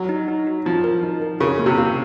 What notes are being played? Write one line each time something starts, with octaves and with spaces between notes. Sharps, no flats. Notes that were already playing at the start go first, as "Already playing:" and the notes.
Already playing: F#3
D#4
D#4
F#4
F3 F#4
A#4
D#4
A#4
C#3 A#4
A#3
C3
F5